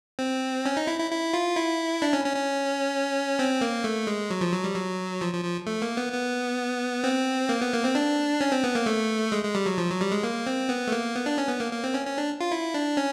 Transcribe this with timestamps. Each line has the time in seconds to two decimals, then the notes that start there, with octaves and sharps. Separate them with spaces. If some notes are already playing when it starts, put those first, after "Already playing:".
0.19 C4
0.66 C#4
0.77 D#4
0.87 E4
0.99 E4
1.11 E4
1.34 F4
1.57 E4
2.02 D4
2.13 C#4
2.25 C#4
2.36 C#4
3.39 C4
3.61 A#3
3.84 A3
4.07 G#3
4.30 F#3
4.41 F3
4.53 F#3
4.64 G3
4.75 F#3
5.21 F3
5.33 F3
5.45 F3
5.67 A3
5.82 A#3
5.97 B3
6.12 B3
7.04 C4
7.49 A#3
7.61 B3
7.72 A#3
7.84 C4
7.95 D4
8.41 C#4
8.52 C4
8.64 B3
8.75 A#3
8.86 A3
9.32 G#3
9.44 G#3
9.55 G3
9.66 F#3
9.78 F3
9.90 F#3
10.01 G3
10.12 G#3
10.23 A#3
10.47 C4
10.69 B3
10.87 A3
10.92 A#3
11.15 B3
11.26 D4
11.38 C#4
11.49 B3
11.60 A#3
11.72 A#3
11.84 C4
11.94 C#4
12.06 C#4
12.18 D4
12.41 F4
12.51 E4
12.74 D4
12.97 C#4